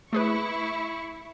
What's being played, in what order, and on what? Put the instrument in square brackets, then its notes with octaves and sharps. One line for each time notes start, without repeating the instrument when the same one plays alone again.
[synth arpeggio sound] A3 G#4 B4 [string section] E4 C#6